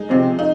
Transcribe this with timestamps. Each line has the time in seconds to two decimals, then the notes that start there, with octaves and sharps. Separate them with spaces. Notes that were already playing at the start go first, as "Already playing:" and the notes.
Already playing: G#3 D#4
0.10 C3 F3 C4
0.39 D#4